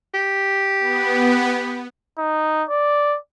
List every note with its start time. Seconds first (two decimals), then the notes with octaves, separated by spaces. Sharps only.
0.14 G4
0.80 B3
2.18 D#4
2.69 D5